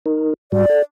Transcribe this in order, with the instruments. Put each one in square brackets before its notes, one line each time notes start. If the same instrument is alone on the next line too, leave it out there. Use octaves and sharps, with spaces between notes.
[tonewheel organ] D#4 A#4
[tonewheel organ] G#2 G3 F#4 [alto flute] D5
[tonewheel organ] A4